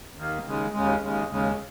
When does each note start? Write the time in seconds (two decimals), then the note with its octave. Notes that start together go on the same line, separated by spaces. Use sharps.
0.15 D#2 D#3 A#3
0.44 D#2 C#3 G#3
0.72 D#2 C#3 G#3
1.01 D#2 C#3 G#3
1.29 D#2 C#3 G#3